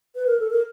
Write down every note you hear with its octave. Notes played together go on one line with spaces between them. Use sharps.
B4
A#4
A4
A#4